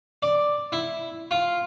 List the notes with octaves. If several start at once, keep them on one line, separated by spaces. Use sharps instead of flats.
D5
E4
F4